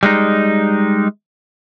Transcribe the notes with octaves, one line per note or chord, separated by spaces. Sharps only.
G3 G#3 D#4